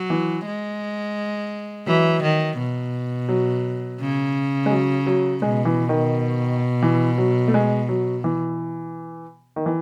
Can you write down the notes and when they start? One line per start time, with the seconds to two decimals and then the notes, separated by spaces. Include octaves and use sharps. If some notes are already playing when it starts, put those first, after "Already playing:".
Already playing: F#3
0.10 E3
0.46 G#3
1.87 E3 F#3
2.23 D#3
2.58 B2
3.29 F#3
4.00 C#3
4.66 G#3
4.70 F#3
5.07 F#3
5.42 B2 G#3
5.65 E3
5.89 D#3
6.82 E3
7.18 F#3
7.48 A3
7.54 G#3
7.89 F#3
8.24 E3
9.56 D#3
9.66 E3